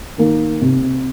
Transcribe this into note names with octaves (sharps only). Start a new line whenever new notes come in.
D#3 A#3
C3